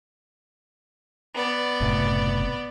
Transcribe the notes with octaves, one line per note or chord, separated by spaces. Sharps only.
B3 D5
F#1 A2 C3